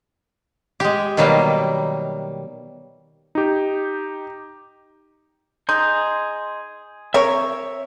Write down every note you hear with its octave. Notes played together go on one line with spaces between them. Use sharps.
G#3 G4
B2 D#3 F#3 G3 A#3
D#4 G4
D#4 G#4 C6 G6
C4 A#4 C#5 E5 C#6